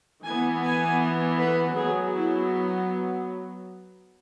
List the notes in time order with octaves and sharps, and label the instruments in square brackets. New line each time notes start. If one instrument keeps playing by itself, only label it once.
[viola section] E3 B3 G#5
G#5
B4
F#3 B3 G#4
E4